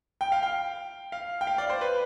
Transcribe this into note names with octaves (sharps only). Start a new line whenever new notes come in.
G5
F5
G5
F5
G5
F5
D5
C5
B4